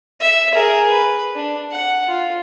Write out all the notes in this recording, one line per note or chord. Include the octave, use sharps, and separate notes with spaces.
E5
G#4 A#4
B4
D4
F#5
F4